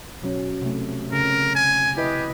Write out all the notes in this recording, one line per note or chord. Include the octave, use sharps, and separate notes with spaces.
B2 F#3 C#4
C3 A3
C#3 A#4
G#5
E4 G4 B4 D#5